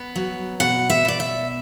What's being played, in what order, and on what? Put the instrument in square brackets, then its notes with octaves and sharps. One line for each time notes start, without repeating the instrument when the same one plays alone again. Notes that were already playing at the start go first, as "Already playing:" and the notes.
Already playing: [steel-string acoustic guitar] B3
F#3
B2 F#5
E5
B2 D5
E5